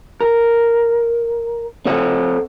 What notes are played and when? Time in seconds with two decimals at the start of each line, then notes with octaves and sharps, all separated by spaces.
0.21 A#4
1.85 C4 A4 F#5